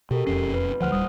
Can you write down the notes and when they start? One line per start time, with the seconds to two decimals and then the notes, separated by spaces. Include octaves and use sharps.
0.11 B2 G4 A4 A#4
0.27 E1 F2 C#4 C7
0.54 B4
0.80 D2 F3 C5 F#5 F6
0.92 D1 G3 D#6